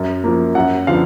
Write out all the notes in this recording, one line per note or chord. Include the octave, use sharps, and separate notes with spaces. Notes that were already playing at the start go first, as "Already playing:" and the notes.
Already playing: F#2
F3 A#3
F#2 F#5
D3 F3 B3 F5